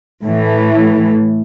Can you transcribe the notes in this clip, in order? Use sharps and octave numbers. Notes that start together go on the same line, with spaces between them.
A2 E3 A3